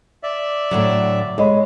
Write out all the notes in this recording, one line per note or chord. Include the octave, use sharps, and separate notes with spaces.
D5 E5
A2 D3 F#3
G#3 C#5 D#5 B5